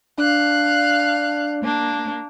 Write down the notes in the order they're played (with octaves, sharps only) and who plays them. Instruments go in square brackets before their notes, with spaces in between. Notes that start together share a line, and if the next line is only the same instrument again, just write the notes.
[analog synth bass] D4 [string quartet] F5 F#6
[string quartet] A#3 D4